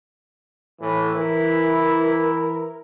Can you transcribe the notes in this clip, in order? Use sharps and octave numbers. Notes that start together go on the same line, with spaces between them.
A2 E3
E3 E4 A#4